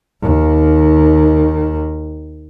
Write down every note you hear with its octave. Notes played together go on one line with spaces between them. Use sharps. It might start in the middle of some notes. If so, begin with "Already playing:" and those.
D#2 D#3